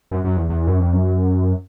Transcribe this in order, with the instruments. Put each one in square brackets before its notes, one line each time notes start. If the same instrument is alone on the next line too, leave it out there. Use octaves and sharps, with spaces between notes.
[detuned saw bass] F#2
F#2
E2
E2
F#2
F2
F#2